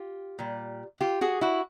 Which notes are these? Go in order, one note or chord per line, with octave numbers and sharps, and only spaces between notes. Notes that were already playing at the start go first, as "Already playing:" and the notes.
Already playing: F4 G4
A#2 G3
F4 G4
F#4 G#4
E4 F#4